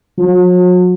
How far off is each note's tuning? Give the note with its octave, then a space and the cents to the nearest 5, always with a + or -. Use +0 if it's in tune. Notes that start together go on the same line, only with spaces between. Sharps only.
F#3 -45